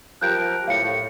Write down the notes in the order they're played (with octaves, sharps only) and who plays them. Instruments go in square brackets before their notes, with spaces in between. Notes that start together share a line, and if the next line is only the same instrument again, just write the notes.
[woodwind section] F3 G4 A#4 [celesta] F#6 G6 D7
[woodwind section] A2 [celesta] F5 C#7